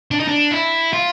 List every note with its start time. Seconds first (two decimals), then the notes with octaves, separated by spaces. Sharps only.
0.11 D4
0.20 D#4
0.28 D4
0.52 E4
0.93 F4